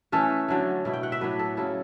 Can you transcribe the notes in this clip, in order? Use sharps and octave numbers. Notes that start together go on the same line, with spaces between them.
E3 A3 C#4 A4
D3 F#3 A3
B2 A3 E4
G5
F#5
E5
A2 F#3 B3 D4 B4
A4
C#3 F#3 B3 E4 A4